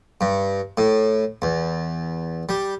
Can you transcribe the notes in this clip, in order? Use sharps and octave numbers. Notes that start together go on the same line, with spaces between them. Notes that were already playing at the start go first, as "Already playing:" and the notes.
G2
A2
E2
G3